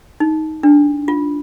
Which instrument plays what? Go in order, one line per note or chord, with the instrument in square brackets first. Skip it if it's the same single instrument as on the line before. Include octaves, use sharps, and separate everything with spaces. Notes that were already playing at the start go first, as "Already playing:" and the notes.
[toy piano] D#4
D4
F4